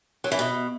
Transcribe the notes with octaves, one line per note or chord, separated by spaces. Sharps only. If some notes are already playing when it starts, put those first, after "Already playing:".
F#3
E3
B2